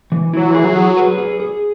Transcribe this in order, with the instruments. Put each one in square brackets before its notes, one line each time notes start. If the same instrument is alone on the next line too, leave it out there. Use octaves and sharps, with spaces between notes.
[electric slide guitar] E3
[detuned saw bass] F#3 [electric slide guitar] E4
[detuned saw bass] E3 [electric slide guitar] G#4
[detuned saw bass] F#3
[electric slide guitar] G#4
B4
G#4
G#4